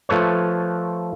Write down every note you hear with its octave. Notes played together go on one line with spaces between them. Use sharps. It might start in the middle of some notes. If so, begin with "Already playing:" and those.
F3 A3 B4 C#5